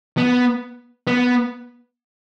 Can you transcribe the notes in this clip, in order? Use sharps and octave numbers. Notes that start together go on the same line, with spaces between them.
B3
B3